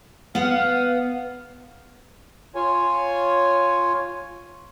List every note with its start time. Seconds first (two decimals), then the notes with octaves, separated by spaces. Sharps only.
0.35 B3 F5 F#5
2.55 F4 C#5 G#5